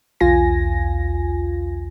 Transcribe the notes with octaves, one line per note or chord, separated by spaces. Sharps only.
B1 E2 F4 G#5 A#6